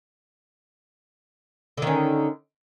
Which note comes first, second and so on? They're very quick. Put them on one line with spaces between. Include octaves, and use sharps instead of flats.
D3 D#3 C#4